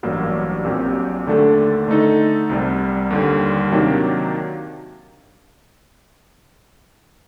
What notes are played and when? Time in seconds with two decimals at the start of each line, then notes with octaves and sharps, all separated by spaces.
0.03 A1 G2 F#3 A#3
0.65 A#1 A#2 F#3 C4 G4
1.26 D#2 D3 A3 D4 A4
1.88 D3 A3 D#4 A4
2.50 C2 C3 G3
3.11 D#2 D3 G3
3.72 C3 D#3 F#3 A#3 D4